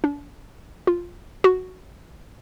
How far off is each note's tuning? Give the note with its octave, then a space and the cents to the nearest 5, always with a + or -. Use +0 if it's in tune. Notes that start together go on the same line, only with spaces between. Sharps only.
D4 -35
F4 +0
F#4 +0